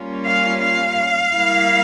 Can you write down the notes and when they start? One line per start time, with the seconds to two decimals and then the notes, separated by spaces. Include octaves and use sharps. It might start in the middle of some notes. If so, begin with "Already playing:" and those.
Already playing: G3 A#3 C#4 F4
0.26 F5
0.61 F5
1.32 G3 A#3 E4